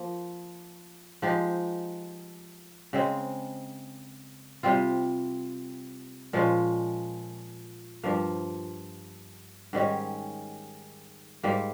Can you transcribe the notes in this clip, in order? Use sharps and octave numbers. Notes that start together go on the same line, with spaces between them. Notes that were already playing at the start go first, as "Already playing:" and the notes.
Already playing: F3 A#3
F3 G#3 D#4 G4
C#3 G#3 C4
C3 G3 C4 F4
A#2 F3 G#3 C#4
G2 F3 A#3
G#2 D#3 G3 C#4
G#2 G3 A#3